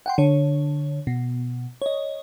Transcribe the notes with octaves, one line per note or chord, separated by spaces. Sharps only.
F#5 G5 C6
D3 C#5
B2
C#5 D#5